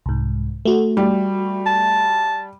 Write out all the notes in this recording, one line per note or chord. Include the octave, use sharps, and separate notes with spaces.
C2 G#2
A3 F#4
G3
A5